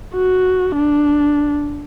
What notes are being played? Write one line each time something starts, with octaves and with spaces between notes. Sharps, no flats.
F#4
D4